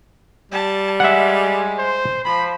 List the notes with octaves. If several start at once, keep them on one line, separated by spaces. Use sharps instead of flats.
G3 A5
G#3 E5 F#5
C5
F3 B5